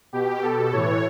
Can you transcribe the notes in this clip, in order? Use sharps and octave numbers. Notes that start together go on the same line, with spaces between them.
B2 G4
B2 A4
A2 E3 C#5